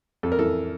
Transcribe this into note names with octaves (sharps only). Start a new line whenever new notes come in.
F2 A4
A#4
E3 A4